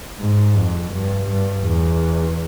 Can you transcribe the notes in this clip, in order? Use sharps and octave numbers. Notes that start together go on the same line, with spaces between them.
G#2
F2
G2
G2
E2